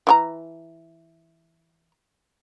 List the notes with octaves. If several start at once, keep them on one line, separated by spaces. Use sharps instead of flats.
E3 G4 A#5